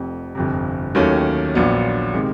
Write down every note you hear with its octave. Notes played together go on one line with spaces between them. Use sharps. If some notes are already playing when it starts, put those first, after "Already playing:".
Already playing: F1 F2 C3
G1 F2 C3
D#2 D#3 F#3 A3 C#4
A#1 A#2 F#3 B3 D4
C3 D#3 G#3